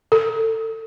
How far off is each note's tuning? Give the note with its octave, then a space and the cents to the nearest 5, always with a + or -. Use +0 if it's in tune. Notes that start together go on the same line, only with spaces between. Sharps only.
A4 +25